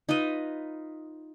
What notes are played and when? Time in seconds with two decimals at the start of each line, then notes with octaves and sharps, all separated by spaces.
0.09 D#4 F4 B4 D#5